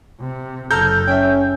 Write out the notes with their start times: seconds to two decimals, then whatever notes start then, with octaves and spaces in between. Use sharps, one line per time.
0.20 C3
0.71 F#1 A4 A#5 F6 G6
1.07 C#4 E5 G5